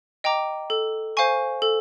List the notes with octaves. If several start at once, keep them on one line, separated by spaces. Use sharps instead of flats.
D#5 G5 A#5 D6
A4
C5 F5 G#5 C#6
A4